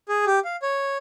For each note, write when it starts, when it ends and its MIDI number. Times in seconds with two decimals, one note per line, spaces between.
0.09 0.25 68
0.26 0.39 67
0.45 0.56 77
0.62 0.98 73